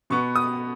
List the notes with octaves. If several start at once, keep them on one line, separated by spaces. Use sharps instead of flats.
B2 B3 C#6
D#6